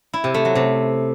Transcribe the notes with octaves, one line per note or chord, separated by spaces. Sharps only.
E4
C3
A3
F#3
C3